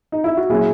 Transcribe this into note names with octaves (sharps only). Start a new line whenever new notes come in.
D#4
E4
F#4
A#2 F#3 C#4 E4 G#4